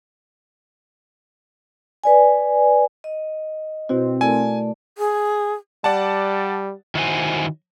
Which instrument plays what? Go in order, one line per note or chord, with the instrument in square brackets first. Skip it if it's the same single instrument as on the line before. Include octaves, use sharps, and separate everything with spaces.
[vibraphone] B4 D5 G#5
D#5
[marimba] B2 E4 F#4 [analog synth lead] C4
[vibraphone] A3 D5 [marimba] E4 A4 A#4 [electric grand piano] G#5
[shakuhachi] G#4
[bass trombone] G3 [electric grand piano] D5 F#5 A5
[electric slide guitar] D#3 E4 F#4 C5 G#5